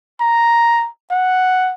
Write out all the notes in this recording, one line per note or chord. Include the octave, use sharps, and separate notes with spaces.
A#5
F#5